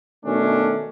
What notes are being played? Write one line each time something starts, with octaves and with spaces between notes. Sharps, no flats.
B2 D#3 A3 C#4 D4